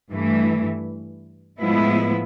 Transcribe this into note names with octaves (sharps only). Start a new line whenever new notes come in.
G2 E3 A3
A2 F3 G#3 B3 E4